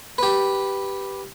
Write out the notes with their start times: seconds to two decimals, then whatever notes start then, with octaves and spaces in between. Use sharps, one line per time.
0.18 G4 B4